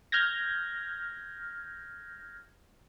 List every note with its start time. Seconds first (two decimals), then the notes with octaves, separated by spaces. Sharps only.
0.12 F6 G6 G#6 A#6